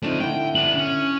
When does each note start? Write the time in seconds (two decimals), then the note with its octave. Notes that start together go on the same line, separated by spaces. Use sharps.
0.03 F3 A3 C4 D4 D#4
0.20 D3 E4 G5
0.55 B3 D4 F#7
0.78 C#4